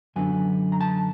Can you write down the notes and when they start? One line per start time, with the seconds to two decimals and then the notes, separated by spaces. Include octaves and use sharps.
0.16 F#2 D3 F#3 B3 D4 G#5
0.72 A#5
0.81 A5